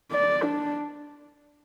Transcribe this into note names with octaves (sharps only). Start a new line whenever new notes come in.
D5
D4